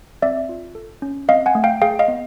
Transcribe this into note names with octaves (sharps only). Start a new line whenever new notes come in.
C4 D5 E5
F4
A4
C#4
C4 D#5 F5
F#5 G#5
A3
F5 G5
G#4 F5 G5
D#5 F5
B3